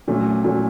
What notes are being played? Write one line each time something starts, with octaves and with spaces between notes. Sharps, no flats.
A#2 F#3 A3 C#4
A#2 F#3 A3 C#4